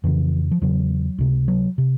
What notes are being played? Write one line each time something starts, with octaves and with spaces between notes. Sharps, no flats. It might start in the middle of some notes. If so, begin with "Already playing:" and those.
F2 C#3 E3
F3
E2 C#3 F#3
C#2 C3
F#3
C3